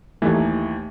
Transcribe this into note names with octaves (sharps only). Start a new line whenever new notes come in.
D#2 E3 A3 D#4 G4